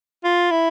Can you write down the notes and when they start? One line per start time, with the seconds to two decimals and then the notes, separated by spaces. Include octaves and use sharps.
0.24 F4
0.51 E4